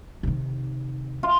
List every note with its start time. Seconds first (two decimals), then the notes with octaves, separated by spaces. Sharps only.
0.23 C3 D#3
1.23 F4